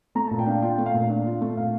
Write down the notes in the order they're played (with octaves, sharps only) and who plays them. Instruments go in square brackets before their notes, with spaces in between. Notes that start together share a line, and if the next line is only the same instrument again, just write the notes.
[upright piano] A3 A#5
A#2 A5
G5
D4 F5
F4 G5
A3
F5
A#2
D4 F5
F4
A3
A#2 F5